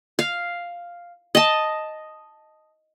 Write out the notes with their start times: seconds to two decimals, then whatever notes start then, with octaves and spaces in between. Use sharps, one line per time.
0.19 F5
1.35 D#5 A5